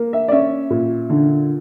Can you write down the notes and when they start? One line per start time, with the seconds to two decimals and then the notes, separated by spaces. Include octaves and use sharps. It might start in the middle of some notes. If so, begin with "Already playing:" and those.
Already playing: A#3
0.13 E5
0.28 D5
0.32 C#4 E5
0.70 A#2
1.10 D3